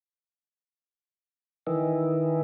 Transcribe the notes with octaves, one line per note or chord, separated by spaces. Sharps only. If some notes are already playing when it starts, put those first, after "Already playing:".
D#3 E3